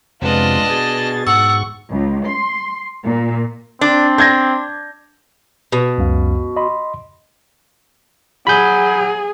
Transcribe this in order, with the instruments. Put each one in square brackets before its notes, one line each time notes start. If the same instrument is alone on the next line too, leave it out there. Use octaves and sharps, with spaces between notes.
[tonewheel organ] F2 C3 [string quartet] G#3 B3 F4 [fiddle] D4 D#5
[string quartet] B2 A6 [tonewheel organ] G#4
[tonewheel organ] G#2 C#6 [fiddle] F#5 [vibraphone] E6
[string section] C#2
C6
A#2
[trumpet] C4 [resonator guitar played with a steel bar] D4
[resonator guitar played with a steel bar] D4 [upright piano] G6 G#6 A#6
[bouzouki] B2
[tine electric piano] C#2 F#2 F5
D#5 B5 C6
[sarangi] F#3 [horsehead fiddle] G#4 [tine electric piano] B5 G6